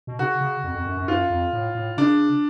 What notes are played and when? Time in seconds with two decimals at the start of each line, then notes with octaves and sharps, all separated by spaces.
0.07 B2
0.19 C#3 F#4
0.41 C#3
0.64 F2
0.75 F2
0.86 F#2
0.97 F#2
1.08 F#2 F4
1.30 F2
1.53 A2
1.75 A2
1.97 C#3 D4